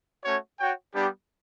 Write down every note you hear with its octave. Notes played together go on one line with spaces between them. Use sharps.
A3 C#4 F#4 C#5
F#4 C#5 G5
G3 B3 D4 G4